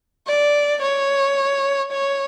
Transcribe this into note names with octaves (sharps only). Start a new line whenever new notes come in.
D5
C#5
C#5